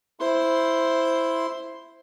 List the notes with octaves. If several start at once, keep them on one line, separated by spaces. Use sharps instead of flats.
E4 C5 C6